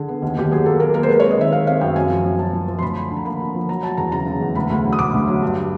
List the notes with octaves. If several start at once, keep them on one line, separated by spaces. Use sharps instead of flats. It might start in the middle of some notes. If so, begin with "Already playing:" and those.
Already playing: D3 G#4
B3
D#2
D#2 G4
F#3 G#4
A#3 A4
A#3 A#4
A#3 A#4
C5
G#3 B4
C4 C#5
D#5
D#3 E5
C4 F5
C4 F5
F#2 G5
F#2 G#5
F3
F#2
F#2 A5
F3
F3
C6
D2 B5
D3
D3
A#5
A#3 B5
D3
F3
F#3 A#5
F#3 A5
E2 A#5
C#3 A#5
C#3
E2
D2 B5
D2
F#3
D#6
D2 D6
D2
F#3
G2